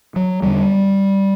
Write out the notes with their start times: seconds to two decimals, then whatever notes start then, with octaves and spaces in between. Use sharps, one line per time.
0.16 F#3
0.42 E2 D3 G3